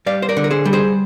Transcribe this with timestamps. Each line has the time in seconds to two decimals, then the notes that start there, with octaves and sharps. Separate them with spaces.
0.06 G3 D5 F5
0.22 C5
0.29 A#4 D5
0.37 D3
0.44 A#4
0.50 G#4 C5
0.65 G3
0.73 G#4 C5